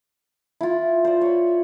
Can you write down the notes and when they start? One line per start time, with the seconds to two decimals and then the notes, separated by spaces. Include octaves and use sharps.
0.61 E4 F4
1.05 C5 D5
1.21 C#5 B5